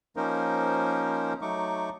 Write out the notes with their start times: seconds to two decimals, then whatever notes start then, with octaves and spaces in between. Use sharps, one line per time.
0.17 F3 A#3 C#4 D#4 A#4 C5
1.42 F#3 A3 D#4 C#6 D6